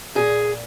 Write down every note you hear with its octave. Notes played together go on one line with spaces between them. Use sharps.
A#2 G#4